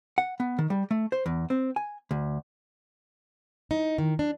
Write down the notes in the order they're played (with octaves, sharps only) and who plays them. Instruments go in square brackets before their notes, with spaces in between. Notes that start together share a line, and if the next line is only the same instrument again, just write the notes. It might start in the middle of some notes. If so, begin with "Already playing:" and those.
[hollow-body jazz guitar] F#5
B3
D#3
G3
A3
C5
E2
C4
G#5
D2
[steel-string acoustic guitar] D#4
D#3
D4